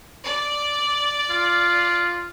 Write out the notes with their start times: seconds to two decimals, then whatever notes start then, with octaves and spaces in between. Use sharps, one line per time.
0.25 D5
1.30 F4